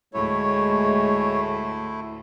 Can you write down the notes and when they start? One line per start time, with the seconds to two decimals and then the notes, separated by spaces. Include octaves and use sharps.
0.14 D2 A2 G#3 A3 E4 C#5